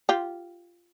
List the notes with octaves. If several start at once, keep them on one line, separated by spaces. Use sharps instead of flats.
F4 G4